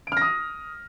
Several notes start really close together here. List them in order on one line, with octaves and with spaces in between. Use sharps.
D7 F6 A#6 D#6